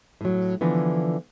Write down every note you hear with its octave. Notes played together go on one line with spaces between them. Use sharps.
A2 F#3
D3 E3 F3 B3